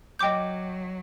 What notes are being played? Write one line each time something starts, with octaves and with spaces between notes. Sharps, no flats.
F#3 D#5 G5 D6 G6